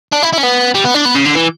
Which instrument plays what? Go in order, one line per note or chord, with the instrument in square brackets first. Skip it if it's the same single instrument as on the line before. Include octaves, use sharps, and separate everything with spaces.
[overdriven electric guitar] D4
E4
E4
C#4
B3
G3
B3
D4
B3
C#3
D3
E3